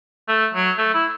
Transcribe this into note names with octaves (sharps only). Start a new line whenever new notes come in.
A3
F#3
A3
E4